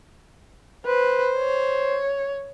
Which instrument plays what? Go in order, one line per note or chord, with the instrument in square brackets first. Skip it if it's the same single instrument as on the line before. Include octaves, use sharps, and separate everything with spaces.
[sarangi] B4 [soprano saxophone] C5
[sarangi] C#5